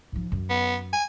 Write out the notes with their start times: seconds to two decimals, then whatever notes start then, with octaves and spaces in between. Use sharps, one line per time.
0.12 G#2 F3
0.32 F#2
0.50 B3
0.93 G#5